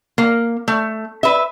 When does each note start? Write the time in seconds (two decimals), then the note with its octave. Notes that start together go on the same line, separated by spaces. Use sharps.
0.18 A#3
0.68 A3
1.23 B4 E5